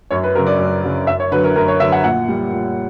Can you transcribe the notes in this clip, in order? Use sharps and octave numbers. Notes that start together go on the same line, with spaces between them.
F#2 C#5
B4
C#3 F#3 A#4
D5
F#2
C#3 F#3
F#2 E5
C#5
D3 F#3 B4
A#4
F#2 A#4
C#5
D3 F#3 E5
F#5
A#2 F#5
G3
A#2